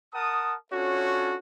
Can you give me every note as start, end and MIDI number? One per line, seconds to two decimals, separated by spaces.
0.13 0.54 70
0.13 0.54 78
0.13 0.54 81
0.13 0.54 87
0.72 1.36 61
0.72 1.36 62
0.72 1.36 65
0.72 1.36 66
0.72 1.36 69
0.72 1.36 73